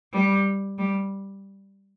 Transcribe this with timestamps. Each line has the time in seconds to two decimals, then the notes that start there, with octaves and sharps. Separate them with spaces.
0.13 G3
0.78 G3